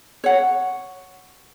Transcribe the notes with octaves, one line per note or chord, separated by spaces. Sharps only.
C#5 F#5